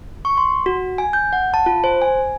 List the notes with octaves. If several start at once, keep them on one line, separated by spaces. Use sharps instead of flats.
C#6
C6
F#4
G#5
G6
F#5
A5
F4
C5
G#5